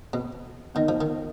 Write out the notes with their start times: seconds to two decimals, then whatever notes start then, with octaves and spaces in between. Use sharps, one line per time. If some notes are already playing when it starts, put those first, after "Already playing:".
0.13 B2
0.75 D#3 B3 D#4 A#4 D#5
0.88 F3
1.01 D#3